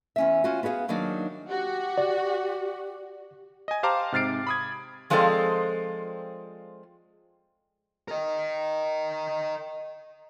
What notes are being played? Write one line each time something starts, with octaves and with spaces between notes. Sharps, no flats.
E2 C#4 E5
C#4 F4 F#4
B3 F#4 G#4 E5 F5
D#3 F#3 A#3 D4 D#4
F#4 G4
D5
D#5 G#5
G4 C5 F5 A5 A#5 D6
G#2 C3 F6 A6 C7 D7
B5 D#6 G#6
F3 G#3 C4 F4 A4 D5
A#4 D#5